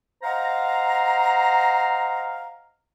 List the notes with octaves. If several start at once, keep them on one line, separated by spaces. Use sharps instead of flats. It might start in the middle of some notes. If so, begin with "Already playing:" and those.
C5 D#5 F5 F#5 A#5